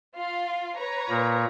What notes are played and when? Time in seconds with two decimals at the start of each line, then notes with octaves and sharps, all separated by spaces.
0.15 F4 F5
0.76 B4 C#5 A#5
1.10 A#2 A#3